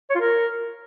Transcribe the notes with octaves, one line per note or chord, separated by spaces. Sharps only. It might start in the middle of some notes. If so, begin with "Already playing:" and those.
C#5
F4
A#4